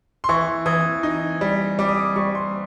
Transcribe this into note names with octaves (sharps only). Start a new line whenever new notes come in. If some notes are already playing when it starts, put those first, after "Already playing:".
C6
E3 C#6
E3 D#6
D#4
G3
G3 D6
D#6
D6
G3 C#6
C6